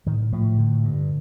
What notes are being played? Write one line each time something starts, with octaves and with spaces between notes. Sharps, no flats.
A2 D#3
A2 F3
D3
G2